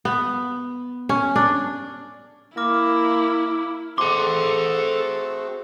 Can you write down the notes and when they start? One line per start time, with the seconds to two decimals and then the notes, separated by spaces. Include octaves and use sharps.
0.05 B3
1.09 C#4
1.36 D4
2.57 A#3 E4 D6 F6 A#6
3.98 A3 C4 F#4 G#4 A4 C6 D6